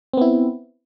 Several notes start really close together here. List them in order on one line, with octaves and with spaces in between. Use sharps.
C4 B3 E4